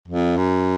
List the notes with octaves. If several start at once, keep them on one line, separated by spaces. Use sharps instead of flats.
F2
F#2